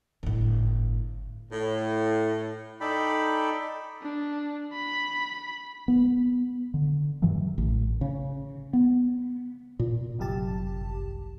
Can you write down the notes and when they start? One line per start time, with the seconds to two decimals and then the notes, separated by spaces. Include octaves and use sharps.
0.23 G1 A2
1.51 A2
2.81 D#4 A4 D5 G5 B5
4.02 D4
4.73 B5
5.88 B3
6.74 D3
7.22 G2 D#3 E3 F#3
7.58 A1
8.01 C#3
8.73 B3
9.79 A#2
10.18 G1 C2 F#2 G4 A5